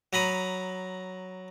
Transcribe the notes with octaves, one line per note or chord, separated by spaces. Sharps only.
F#3 A#5 B5 D#6